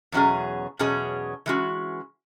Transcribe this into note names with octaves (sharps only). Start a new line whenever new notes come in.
E2 B2 F#3 C#4 G#4
E2 B2 F#3 C#4 G#4
E3 G#3 C#4 F#4